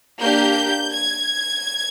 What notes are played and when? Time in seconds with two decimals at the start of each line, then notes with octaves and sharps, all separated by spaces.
0.19 A#3 D4 G4 G6
0.91 G#6